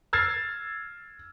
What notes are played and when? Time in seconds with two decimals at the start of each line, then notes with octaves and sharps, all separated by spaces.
0.13 E6 F6 G#6 A6 C7